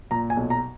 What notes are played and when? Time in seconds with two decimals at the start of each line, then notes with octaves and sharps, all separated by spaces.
0.11 A#2 A#5
0.30 G#5
0.37 B1
0.50 A#5